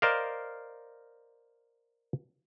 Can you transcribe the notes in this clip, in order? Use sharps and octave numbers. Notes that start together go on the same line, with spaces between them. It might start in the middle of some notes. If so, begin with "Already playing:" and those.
A#4 C5 D5 D#5 F5